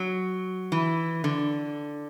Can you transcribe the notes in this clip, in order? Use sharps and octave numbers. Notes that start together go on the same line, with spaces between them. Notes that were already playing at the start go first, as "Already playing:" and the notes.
Already playing: F#3
E3
D3